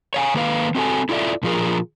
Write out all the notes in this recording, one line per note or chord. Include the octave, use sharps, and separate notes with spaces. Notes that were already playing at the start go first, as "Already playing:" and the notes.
C#5 F5 G#5
D#3 A#3 B4 F5
C4 F#4 A4 G#5
E4 F4 A4 D5 E5
A#2 F3 F4 G#4 A#4